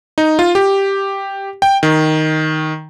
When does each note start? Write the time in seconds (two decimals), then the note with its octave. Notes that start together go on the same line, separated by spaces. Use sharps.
0.18 D#4
0.39 F4
0.55 G4
1.62 G5
1.83 D#3